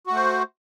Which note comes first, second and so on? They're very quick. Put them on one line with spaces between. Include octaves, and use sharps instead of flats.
F#4 A3 C5